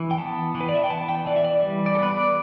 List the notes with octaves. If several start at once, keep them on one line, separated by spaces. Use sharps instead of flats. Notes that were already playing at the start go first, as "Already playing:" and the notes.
Already playing: E3
G5
B3 A5
E3
B4
D5
E5
G5
B3 A5
G5
E3 D5
E5
D5
G3
D5
A4
B3 B4
D5